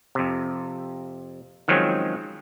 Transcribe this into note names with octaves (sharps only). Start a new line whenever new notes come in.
F2 C3
D#3 F3 F#3 G#3 C4 C#4